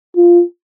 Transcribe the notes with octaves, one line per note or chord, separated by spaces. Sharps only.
F4